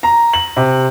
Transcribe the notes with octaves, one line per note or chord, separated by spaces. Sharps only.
A#5
F#7
C3